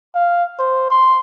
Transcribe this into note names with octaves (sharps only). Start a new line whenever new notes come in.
F5
C5
C6